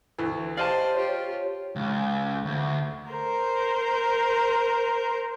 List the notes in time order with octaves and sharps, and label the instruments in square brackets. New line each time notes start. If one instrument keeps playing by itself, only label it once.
[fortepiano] D2 E3
[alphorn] G4 [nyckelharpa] C5 [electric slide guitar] D5 D#5 A5 [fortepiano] F5
[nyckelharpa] F4 G4 [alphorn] C#5
[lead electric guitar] C#2
D2
[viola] A#4 C5